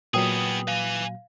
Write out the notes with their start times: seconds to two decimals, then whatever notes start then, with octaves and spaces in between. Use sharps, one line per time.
0.14 A#2 F#3 B3 G#4 B4 G5 D#6
0.68 B4 F5 G#5